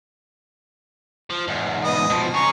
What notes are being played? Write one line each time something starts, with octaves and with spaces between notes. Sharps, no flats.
F3
E2 G#2
B3 D#5 D#6
B2 F3
G#4 C#5 A#5 C#6